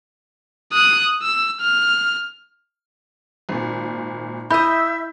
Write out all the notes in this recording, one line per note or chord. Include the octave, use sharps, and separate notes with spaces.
D#6 F#6
E6
F6
G#1 A#2
E4 D#5 E5 B5 G6